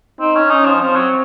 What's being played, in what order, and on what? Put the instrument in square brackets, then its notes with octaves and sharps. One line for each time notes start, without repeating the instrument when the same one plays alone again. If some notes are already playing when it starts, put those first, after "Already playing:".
[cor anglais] C4 [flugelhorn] D#4
[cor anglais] C#4
[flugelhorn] C#4 [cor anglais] D#4
[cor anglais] F3
[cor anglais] F3 [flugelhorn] C4
[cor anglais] F#3